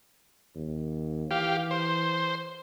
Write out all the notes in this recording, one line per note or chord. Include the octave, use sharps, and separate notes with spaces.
D#2
E3 G4 F5
C5